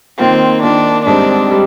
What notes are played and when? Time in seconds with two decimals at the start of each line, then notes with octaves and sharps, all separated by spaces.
0.19 D#3 A#3 C4 F4
0.62 D#3 A#3 D4 F4
1.05 G#2 G3 C4 D4
1.51 G3